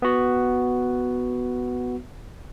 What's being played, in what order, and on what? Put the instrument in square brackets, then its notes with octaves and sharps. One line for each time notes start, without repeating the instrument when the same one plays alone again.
[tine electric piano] B3 F#4